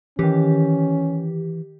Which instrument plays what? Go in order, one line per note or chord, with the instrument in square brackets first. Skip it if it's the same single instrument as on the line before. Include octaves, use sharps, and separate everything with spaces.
[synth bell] D#3 G4 [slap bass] E3 [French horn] C#4